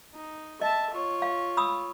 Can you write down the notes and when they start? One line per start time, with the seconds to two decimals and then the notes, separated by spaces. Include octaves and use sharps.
0.14 D#4
0.61 D#5 E5 A5
0.91 F4 C#5
1.22 F5
1.57 B5 D#6 E6